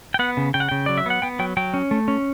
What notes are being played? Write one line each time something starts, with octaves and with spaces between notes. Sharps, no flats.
G5
B3 F#5
C#3
C#3 G5
F#5
C#3 G5
F#3 D5
E5
B3 F#5
B3 G5
F#3 G5
F#3 G5
C#4
A3
C#4